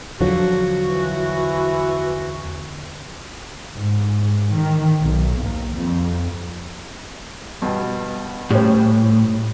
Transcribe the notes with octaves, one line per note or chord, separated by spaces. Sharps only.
E2 D3 F3 F#3 F#4
E3
G#2
D#3
B1
D#2
F2
G2 B2
A2 G3 C#4 C5